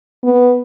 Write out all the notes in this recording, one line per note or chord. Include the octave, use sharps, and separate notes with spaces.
B3